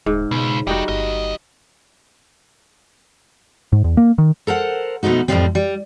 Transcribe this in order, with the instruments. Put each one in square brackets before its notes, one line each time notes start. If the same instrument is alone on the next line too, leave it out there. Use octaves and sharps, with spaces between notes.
[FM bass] D#1 [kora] G#2
[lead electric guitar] C#2 [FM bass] B2
[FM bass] F1 [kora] G3 D#4 F#4 [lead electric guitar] D#5 G5
[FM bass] G1 [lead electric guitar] D#2 D#5
[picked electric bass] G#2
E2
A#3
D#3
[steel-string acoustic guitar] A4 A#4 C5 F#5
B2 F3 A3 D#4 F#4
F2 A2 C#3 F3 G3 C4
G3